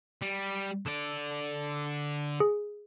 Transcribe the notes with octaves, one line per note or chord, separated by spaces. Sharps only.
G3
D3 D5
G#4